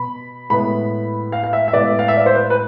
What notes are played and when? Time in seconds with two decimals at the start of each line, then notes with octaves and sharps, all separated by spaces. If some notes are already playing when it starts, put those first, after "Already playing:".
Already playing: B2 B3 B5
0.50 A2 G#3 B3 B5
1.32 F5
1.44 F5
1.53 E5
1.68 E5
1.73 A2 G#3 B3 D5
1.99 F5
2.08 E5
2.17 D5
2.26 C5
2.35 B4
2.50 B4